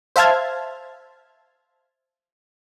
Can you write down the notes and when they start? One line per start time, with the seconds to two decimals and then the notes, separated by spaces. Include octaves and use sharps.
0.16 C5 E5 F5 A5 F6 G#6